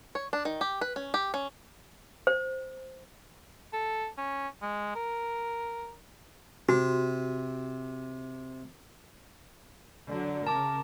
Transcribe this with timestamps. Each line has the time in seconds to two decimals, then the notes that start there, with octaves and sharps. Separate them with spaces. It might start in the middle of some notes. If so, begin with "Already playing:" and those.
0.15 C#5
0.33 D4
0.45 D#3
0.61 G4
0.81 B4
0.96 C#4
1.14 G4
1.34 C#4
2.27 C5
3.73 A4
4.17 C#4
4.62 G#3
4.95 A#4
6.69 C3 F#4
10.08 D3 F#3
10.47 C#3 A#4 A5 D6